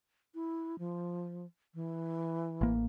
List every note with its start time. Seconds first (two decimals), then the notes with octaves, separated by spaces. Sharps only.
0.35 E4
0.79 F3
1.74 E3
2.61 A1 A#3